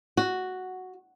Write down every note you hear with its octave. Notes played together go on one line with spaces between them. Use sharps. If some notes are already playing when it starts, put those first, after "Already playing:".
F#4